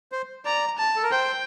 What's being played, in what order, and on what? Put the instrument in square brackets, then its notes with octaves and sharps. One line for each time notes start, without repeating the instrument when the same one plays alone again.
[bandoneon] C5
[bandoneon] D5 [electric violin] A#5
[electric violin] A5
[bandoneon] A4
A#4
[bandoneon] C5 [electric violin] G5